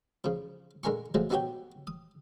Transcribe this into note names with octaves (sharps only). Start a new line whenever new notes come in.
C#3 F3
D3 G#3 A#4 G#5 C#6
F3 F#3 G#3 A3
B3 D#4 F#4 G4 C#5 G5
D#6